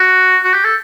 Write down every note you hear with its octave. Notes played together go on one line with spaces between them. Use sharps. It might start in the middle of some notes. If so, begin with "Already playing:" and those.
Already playing: F#4
F#4
G4
A4